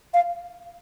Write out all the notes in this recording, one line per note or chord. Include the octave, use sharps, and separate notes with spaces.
F5